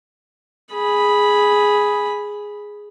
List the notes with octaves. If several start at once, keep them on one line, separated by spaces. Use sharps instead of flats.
G#4 B5